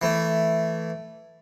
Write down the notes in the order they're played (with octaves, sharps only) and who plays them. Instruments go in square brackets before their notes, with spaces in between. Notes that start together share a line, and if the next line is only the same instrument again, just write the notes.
[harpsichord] E3 A3